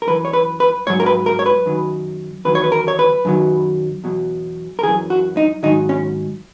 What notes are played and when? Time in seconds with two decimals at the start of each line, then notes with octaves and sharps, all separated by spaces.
0.02 A#4
0.07 F#2 E3 B4
0.25 C#5
0.33 B4
0.60 B4
0.87 G#2 F#3 C#5
1.00 A#4
1.06 B4
1.26 A#4
1.39 C#5
1.46 B4
1.66 F#2 D#3 F#3
2.45 E2 D#3 F#3 B4
2.55 C#5
2.64 B4
2.72 A#4
2.88 C#5
2.99 B4
3.25 F#2 D#3 F#3
4.04 E2 B2 F#3
4.79 A#4
4.83 E3 G#4
4.88 F#2
5.10 F#4
5.37 D#4
5.63 G#2 D#3 F#3 D#4
5.89 C#4